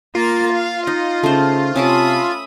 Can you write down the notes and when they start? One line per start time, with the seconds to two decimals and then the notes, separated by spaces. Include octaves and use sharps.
0.15 A#3 F4 A#4 A6
0.52 F5
0.87 D#4 D#5
1.24 C#3 A3 C5
1.76 C3 C#4 E5 A5 B5 D6 D#6